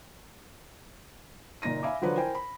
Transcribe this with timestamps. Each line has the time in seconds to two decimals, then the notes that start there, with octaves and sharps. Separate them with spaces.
1.62 F#1 A#2 D#4 A#6 D#7
1.83 E5 F5 G#5 B5 D6
2.02 D3 F3 F#3 B4 C5 D5
2.17 E4 A#4 C5 G5 G#5
2.35 B5